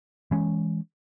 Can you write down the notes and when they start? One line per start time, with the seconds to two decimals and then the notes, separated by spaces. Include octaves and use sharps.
0.31 E3 G#3 C#4